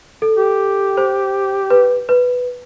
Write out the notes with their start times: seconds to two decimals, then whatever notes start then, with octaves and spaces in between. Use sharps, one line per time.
0.22 A4
0.37 G4
0.97 C5
1.70 B4
2.09 B4